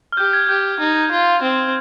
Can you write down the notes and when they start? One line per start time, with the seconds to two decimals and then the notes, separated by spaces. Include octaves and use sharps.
0.12 F6
0.17 G4 G6
0.33 G#6
0.49 G4 G6
0.80 D#4
1.11 F4
1.42 C4